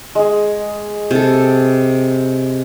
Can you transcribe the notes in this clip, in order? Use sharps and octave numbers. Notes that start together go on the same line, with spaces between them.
G#3 G#4
C3 A4